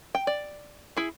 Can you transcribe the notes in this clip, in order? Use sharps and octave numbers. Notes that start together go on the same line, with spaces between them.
G5
D5
E4 G#4